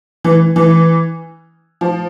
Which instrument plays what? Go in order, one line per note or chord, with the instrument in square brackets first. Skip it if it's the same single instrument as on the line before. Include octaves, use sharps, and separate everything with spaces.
[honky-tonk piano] E3
E3
F3